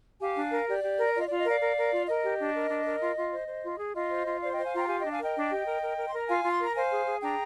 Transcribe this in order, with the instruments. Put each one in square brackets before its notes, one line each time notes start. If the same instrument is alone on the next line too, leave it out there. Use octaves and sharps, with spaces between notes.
[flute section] G4 F5 G#5
D4
A#4
G4 D5
G4
A#4
F4 D5
D#5
F4 D5
D#5
A#4 D5 F5
A#4
A#4
F4
A#4 D#5
G4
D4
A#4
D4
A#4
F4
F4
C5
C5
F4
G#4
F4 D#5
C5
F4
C5 D5 F5
C5 D#5 G5
F5 G#5
F4 G5 A#5
A#5
G4 F5 G#5
D4 D#5 G5
F5 G#5
A#4 D#5 G5
D4
G4
A#4
A#4
A#4
C6
A#4 A#5
F4 F5 G#5
F4
C6
A#4 A#5
C5 F5 G#5
G#4
G#4
D4 G5 A#5